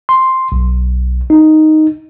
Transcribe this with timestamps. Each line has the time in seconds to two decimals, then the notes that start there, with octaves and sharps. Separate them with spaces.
0.09 C6
0.52 B1
1.30 D#4